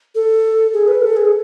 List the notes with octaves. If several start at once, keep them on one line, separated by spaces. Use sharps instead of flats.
A4
G#4
B4
A4
G#4